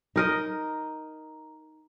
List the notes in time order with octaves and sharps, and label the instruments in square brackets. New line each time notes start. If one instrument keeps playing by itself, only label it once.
[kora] D#4 A#4 D#5